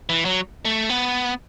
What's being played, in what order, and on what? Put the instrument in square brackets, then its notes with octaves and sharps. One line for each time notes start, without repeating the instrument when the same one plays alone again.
[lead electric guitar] E3
F#3
A3
B3